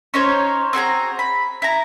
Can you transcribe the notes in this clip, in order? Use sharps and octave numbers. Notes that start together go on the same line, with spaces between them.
C#4 D#4 C5 C#5
C4 F#4 G#4 A#5
B5
E4 A#5